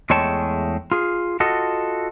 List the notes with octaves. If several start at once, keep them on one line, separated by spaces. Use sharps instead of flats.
E2 G#3 A3 C#5 G5 A5
F4 G#4
F4 F#4 A4 D#5